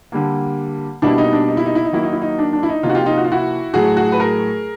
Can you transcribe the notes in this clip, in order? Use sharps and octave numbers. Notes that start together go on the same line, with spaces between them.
D3 G3 A#3
B2 G3 A#3 D4 E4
D#4
D4
D#4
E4
D#4
E4
D#4
D#3 F#3 A#3 E4
D#4
E4
D#4
D4
D4
E4
D#4
C3 F3 A#3 D#4 F4
F#4
F4 G4
D#4 F4
F#4
F4
E4 F#4
A2 F#3 A3 F#4 G#4
F#4 G#4
B4
G#4 A#4